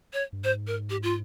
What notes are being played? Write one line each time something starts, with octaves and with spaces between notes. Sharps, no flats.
C#5
G2
G#2 C5
A#4
G4
F4